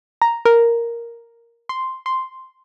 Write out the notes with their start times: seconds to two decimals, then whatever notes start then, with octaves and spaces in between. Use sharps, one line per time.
0.22 A#5
0.45 A#4
1.69 C6
2.06 C6